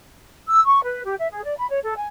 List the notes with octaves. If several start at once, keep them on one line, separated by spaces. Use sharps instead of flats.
E6
C#6
B4
G4
E5
G#4
D5
B5
C#5
A4
G#5